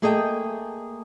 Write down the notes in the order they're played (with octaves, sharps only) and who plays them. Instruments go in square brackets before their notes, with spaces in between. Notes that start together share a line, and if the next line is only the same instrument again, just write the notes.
[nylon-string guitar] A3 A#3 G#4 A4 D#5 G5